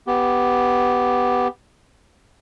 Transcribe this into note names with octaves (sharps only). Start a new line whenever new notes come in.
B3 G4